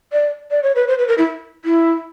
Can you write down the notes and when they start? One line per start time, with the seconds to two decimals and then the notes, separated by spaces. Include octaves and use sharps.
0.13 D5
0.51 D5
0.63 C#5
0.76 B4
0.88 C5
0.99 B4
1.08 A#4
1.18 E4
1.65 E4